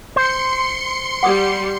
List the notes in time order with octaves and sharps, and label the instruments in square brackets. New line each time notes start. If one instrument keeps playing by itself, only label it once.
[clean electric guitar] C5 [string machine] C6 C#7
[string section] G3 [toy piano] F#5 D6 D#6